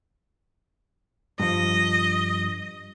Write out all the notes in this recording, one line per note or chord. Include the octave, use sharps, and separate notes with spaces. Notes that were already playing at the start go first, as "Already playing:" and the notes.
G2 F3 D#5